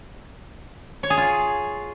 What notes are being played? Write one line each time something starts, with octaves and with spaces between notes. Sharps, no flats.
C#5
G#4
F4